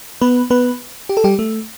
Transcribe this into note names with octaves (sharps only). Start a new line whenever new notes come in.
B3 B4
B3 B4
G4
A4
G3 G4
A3